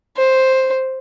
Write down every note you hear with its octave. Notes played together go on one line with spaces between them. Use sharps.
C5